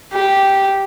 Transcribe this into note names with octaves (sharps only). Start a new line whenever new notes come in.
G4